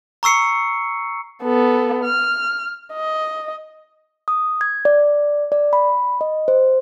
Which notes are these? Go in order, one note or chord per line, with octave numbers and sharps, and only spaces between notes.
A#5 C#6 E6 C7 C#7
B3 A4
F6
D#5
D#6
G#6
D5
D5
B5
D#5
C5